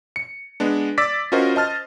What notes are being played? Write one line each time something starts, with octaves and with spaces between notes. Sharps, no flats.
C#7
G#3 B3 D4
D5 D6 E6 A6 B6
C#4 F4 F#4 A#4 C5 D#5
C5 D#5 A5 F6 A6